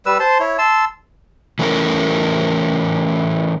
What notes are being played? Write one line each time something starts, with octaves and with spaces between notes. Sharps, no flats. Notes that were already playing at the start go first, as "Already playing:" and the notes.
G3 B4 E6
C5 A5 C6
E4 C#5
A5 C6 E6
E3 A3 C#4 E4 A#4